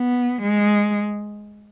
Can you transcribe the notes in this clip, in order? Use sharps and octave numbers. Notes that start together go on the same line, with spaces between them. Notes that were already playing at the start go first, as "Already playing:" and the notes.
Already playing: B3
G#3